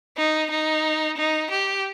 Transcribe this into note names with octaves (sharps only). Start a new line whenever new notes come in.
D#4
D#4
D#4
G4